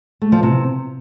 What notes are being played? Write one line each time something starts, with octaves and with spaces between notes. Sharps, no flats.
A3
F3
C3